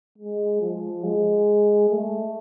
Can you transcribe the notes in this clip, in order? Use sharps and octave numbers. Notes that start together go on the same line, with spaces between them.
G#3
F3
G#3
A3